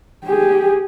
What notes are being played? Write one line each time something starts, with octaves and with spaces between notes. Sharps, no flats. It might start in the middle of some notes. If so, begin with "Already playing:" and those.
G4 G#4